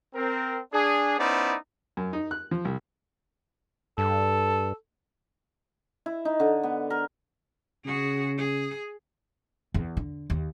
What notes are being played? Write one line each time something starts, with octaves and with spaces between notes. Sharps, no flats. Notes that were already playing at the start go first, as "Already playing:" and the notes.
C4 A#4
D4 G#4
B3 C#4 D#4 E4 C5 D5
F#2
D#4
F#6
F3
C2
G2 A4
E4
D#4
D3
B3
A#4
C#3 F#4 G#4
G#4
E2
D3
D#2